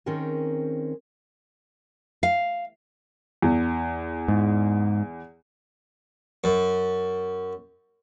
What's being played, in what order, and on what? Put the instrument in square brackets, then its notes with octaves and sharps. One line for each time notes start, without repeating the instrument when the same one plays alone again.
[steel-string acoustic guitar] D#3 C4 C#4 G#4 A#4
[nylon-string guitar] F5
[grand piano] E2
[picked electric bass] G#2
[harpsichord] F#2